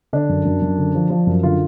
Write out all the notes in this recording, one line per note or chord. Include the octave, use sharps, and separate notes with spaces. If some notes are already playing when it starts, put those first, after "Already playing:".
D3 D4
F#2
F#2
F#2
D3
F3
F3
F#2
D3 F4